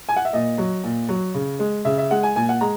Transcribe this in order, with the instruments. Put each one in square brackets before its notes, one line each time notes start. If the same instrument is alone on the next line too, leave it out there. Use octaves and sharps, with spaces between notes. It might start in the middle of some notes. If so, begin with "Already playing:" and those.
[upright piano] G#5
F#5
E5
A#2 D#5
F#3
A#2
F#3
C#3
G#3
C#3 E5
E5
G#3 F#5
G#5
A#2 G#5
F#5
G#3 A#5